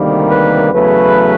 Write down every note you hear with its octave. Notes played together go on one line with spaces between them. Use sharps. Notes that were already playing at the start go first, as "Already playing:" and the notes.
Already playing: D2 C3 D#3 G3 A#3
B4
E2 C#3 F#3 A3 B4